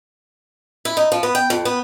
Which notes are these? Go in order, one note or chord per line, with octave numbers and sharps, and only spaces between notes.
E4
D#4
F3
B3
G5
F2
B3